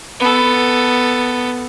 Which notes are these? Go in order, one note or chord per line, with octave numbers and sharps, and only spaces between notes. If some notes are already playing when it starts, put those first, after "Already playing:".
B3 A4